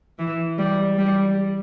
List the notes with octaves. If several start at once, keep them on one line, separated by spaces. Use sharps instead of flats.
E3
G3
G3